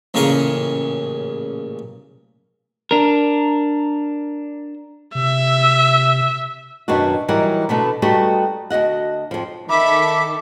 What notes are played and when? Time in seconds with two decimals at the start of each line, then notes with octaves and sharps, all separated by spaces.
0.14 A1 A#2 C#3 G#4 A#4 C#6
2.91 D4 A#4
5.15 C3 E5
6.88 F#2 B2 D#3 D4 F#4
7.28 E3 F#3 G3 D#4 A#4 F#5
7.69 B2 D3 A3 B3
8.02 G3 A3 B3 D#4 F#4 G4
8.70 D2 F#4 D#5 F#5
9.31 F2 F3
9.70 D#3 A4 E5 B5 D6